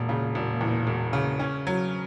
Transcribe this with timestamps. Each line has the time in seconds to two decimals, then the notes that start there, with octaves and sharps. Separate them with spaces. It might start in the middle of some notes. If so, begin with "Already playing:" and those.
Already playing: E1 A#2
0.09 C#3
0.35 E1
0.61 E2
0.87 E1
1.13 C#3
1.39 C#4
1.67 F#3